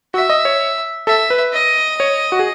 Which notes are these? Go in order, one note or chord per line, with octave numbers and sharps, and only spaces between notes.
F#4 E5
D#5
C#5
A4 E5
B4
D#5
C#5
F#4
G#4